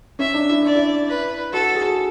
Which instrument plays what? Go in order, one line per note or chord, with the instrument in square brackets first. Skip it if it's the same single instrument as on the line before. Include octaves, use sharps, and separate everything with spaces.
[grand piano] C#4 [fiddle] E5
[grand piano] D4
E4
[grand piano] D4 [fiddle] D5
[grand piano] E4
[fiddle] B4
[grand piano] F#4 [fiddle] A4
[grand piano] G#4